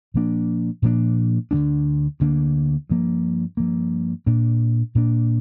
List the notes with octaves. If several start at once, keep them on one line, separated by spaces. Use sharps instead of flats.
A#2 F3 A#3 D4
A#2 F3 A#3 D4
D2 D3 A#3 D4
D2 D3 A#3 D4
G2 F3 A#3
G2 F3 A#3
A#2 A#3 D4
A#2 A#3 D4